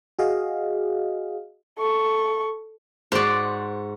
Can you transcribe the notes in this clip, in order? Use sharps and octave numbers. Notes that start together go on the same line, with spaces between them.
F#4 G#4 D#5 F5
A4 C#6
G#2 F#4 C5 D5